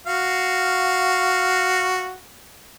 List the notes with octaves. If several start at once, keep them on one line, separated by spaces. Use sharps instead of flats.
F#4 F5